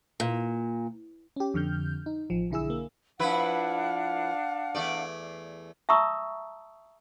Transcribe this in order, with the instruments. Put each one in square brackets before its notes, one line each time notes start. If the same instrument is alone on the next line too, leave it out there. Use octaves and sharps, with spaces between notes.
[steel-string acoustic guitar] A#2
[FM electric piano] C#4 G4
F2 D3 F6 G6
D#4
A1 F3
B1 D3 E4 G#4 E6
A#3
[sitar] F3 E4 B4 [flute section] D4 F5 F#5
[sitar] E2 A3 D5
[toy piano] E5 A5 A#5 C#6 D#6 E6